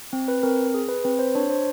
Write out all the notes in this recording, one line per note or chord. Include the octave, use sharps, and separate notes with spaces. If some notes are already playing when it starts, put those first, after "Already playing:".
C4
B4
C4 A#4
G#4
B4
C4 B4
C5
D4 C#5
C5